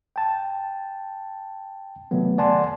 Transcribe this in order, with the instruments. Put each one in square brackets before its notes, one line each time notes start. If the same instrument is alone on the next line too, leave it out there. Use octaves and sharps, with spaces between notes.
[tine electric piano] G5 A5
C3 D#3 F#3 A3 B3
D5 F#5 G#5 A5 C6